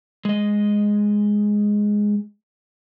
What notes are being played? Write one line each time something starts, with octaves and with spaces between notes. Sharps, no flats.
G#3 D#5